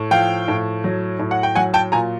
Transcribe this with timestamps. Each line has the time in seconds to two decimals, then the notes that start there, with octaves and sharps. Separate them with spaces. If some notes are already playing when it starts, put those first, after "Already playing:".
Already playing: A2
0.11 F3 F5 G5
0.48 A2
0.84 F#3
1.19 A2
1.31 F#5
1.43 G5
1.55 F#3 F#5 G#5
1.74 G5 A5
1.92 A#2 G#5 A#5